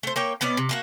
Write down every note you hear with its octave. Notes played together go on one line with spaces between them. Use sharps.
A3 C5
A#3 C#5 G5
B2 B3 C#4 D5
C3
A3 A#3 F#4